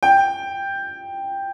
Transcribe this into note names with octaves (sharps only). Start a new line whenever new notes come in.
G5